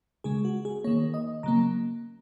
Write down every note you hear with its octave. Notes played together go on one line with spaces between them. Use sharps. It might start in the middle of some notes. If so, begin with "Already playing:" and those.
C#3 G#3 G#4
F#4
G#4
D#3 A#3 C#5
D#5
C#3 F#3 A#3 A#5